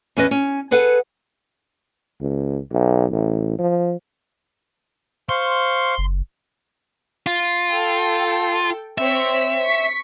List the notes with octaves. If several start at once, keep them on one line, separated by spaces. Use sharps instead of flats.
E2 C#4 B4 D#5
C#4
G#4 A4 B4 F#5
C#2
B1
A1
F3
C5 F5 C6 C#6
F#1
F4
A4 G5
C4 C#5 E5 B6
C#6 B6